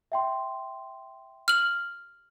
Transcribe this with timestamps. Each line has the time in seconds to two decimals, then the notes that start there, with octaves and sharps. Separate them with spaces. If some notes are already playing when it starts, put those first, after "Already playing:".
0.12 E5 G5 C6
1.48 F6 F#7